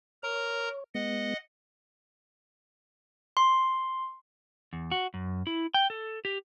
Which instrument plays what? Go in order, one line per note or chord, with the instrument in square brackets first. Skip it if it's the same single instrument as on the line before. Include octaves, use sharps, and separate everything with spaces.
[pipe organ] A#4 A#5 [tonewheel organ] C#5
[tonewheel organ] G#3 B3 [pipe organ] D#5 F#5
[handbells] C6
[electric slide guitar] E2
F#4
F#2
E4
G5
A4
G4